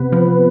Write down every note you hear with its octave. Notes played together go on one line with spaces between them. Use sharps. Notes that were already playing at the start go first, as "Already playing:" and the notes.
Already playing: C3 B3 B4
F3